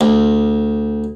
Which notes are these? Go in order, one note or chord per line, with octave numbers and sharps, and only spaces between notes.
D2